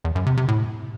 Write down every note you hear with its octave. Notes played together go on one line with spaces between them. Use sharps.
E2
F#2
C3
C3
A2